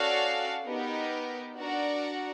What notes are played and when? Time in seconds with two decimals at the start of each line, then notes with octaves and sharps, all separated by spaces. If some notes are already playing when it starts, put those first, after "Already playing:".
Already playing: C#4 F#4 A4 D5 F5
0.66 B3 D#4 G4 A#4 D#5
1.57 D4 F#4 A#4 D5 F#5